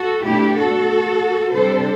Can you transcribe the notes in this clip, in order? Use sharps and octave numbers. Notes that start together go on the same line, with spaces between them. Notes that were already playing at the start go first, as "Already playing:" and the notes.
Already playing: F#4 A4
B2 A3 D4 E4 G4
F#4 A4
C3 G3 D4 A4 C5